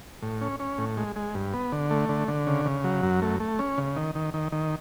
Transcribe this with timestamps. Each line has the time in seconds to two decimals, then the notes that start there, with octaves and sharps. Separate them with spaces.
0.23 A2
0.41 C#4
0.60 C#4
0.78 A2
0.97 G#3
1.16 G#3
1.35 G2
1.53 B3
1.72 D3
1.91 A3
2.09 D3
2.28 D3
2.47 C#3
2.65 C#3
2.84 F#3
3.03 F#2
3.22 A3
3.40 A3
3.59 C#4
3.78 C#3
3.96 D#3
4.15 D#3
4.34 D#3
4.52 D#3